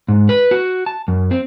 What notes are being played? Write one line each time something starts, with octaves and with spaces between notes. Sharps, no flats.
G#2
B4
F#4
A5
F#2
C4